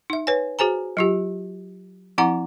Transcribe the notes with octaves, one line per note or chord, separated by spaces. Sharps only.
D#4 E5
B4 C#5 G#5
F#4 G#4 C5 G#5 A#5
F#3 F4 G4
F3 C4 E4 F#5 A#5 D6